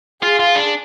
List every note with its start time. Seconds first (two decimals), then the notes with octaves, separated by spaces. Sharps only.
0.23 F4 G#4
0.40 F4
0.56 D4